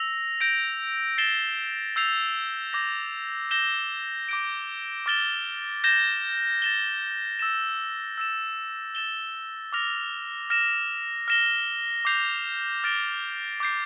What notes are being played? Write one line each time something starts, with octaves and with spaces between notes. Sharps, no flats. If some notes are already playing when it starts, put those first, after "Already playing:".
Already playing: E6 A#6 F7
G6 A#6 D7
A6 C7 E7 G7
E6 G6 C7 F7
D6 G6 A#6
G6 A#6 E7 G7
D6 G6 D7
D6 F6 A6 E7 G7
G6 A#6 E7 G7
A6 E7 G7
E6 A6 E7
E6 A6 E7
A6 E7 G7
D6 F6 A#6 F7
F6 A#6 E7
F6 A#6 E7 G7
D6 G6 C7 F7
F6 A6 D7 G7
D6 G6 C7